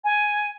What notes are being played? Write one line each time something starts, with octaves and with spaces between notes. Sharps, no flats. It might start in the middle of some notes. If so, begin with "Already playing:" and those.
G#5